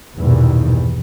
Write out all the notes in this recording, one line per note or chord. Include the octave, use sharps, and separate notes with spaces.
A#1 E2 G2 B2 D#3 E3